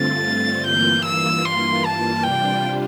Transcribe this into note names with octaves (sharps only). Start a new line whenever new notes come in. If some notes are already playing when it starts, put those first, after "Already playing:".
Already playing: G2 D3 A3 C4 F4 A6
G2 E3 A#3 F4 G6
E6
C6
A5
C3 G3 D4 F4 G5